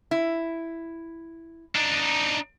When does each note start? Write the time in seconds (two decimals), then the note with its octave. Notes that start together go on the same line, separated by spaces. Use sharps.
0.11 E4
1.76 D4 D#4